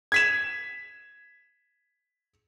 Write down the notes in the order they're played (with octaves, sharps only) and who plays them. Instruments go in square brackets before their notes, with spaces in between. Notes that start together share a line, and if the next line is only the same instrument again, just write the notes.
[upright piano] G#6 B6 E7